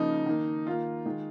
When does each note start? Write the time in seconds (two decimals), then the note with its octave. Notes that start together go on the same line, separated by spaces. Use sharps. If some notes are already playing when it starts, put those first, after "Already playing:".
Already playing: C#3 F3 A#3 D#4
0.26 D#3 A#3
0.66 D#3 A#3 F4
1.06 D#3 G#3